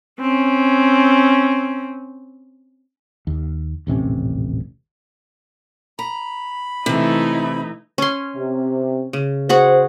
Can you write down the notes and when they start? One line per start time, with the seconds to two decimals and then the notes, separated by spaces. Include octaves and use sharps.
0.20 C4 C#4
3.27 D#2
3.87 D#1 A1 C3 C#4
5.99 A#5 B5
6.86 C3 E3 A3 D#4 E4
7.98 C#4 C6
8.36 C3
9.13 C#3
9.49 F#4 G#4 C5 F#5